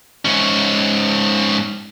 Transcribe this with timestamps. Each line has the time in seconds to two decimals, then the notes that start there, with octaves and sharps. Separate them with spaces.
0.25 G#2 C#4